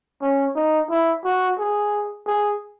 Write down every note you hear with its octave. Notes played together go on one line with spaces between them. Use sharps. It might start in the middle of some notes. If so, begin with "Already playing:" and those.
C#4
D#4
E4
F#4
G#4
G#4